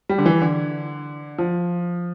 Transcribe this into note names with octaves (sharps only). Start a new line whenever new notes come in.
G3
D3
E3
D3
F3